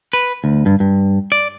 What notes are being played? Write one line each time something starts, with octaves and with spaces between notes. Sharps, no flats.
B4
D2
G2
G2
D5